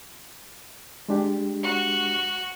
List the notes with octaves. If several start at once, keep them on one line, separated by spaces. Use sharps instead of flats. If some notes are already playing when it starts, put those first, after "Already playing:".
G#3 D4 G4
F#4